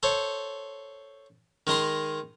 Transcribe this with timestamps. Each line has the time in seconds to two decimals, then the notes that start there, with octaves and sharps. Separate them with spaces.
0.03 A4 C5 C#5
1.67 D#3 G#3 D#5 A#5 C6